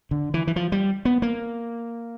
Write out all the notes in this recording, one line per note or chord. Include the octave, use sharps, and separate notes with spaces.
D3
E3
E3
F3
G3
B3
A#3